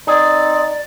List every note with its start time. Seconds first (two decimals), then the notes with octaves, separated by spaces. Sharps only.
0.07 C4 D#4 G#4 D5